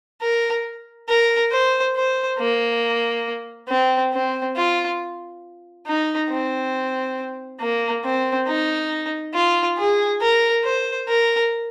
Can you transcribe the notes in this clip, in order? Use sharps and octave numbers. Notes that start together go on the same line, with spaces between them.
A#4
A#4
C5
C5
A#3
C4
C4
F4
D#4
C4
A#3
C4
D#4
F4
G#4
A#4
C5
A#4